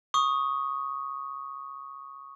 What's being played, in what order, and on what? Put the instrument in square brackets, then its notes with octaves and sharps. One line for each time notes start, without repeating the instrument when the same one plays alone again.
[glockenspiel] C#6 D#6